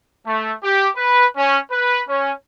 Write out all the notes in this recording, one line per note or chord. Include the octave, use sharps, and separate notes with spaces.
A3
G4
B4
C#4
B4
C#4